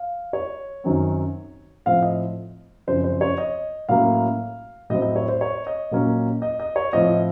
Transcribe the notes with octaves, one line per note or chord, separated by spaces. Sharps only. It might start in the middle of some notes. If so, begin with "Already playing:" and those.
Already playing: F5
C#5
F#2 D#3 F#3 C4
A2 F3 C4 F5
D#5
F#2 C#3 F3 C4 C5
C5
C#5
D#5
A2 F#3 A#3 C#4 F5
A2 F#3 C4 D#5
D#5
C#5
C5
C#5
D#5
A#2 F#3 A#3 C#4
D#5
D#5
C#5
A2 F3 C4 D#5